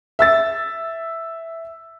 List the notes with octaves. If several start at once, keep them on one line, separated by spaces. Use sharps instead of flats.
E5 E6 A6